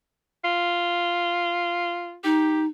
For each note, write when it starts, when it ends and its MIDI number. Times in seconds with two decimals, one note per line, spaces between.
0.45 2.18 65
2.24 2.67 63
2.24 2.62 67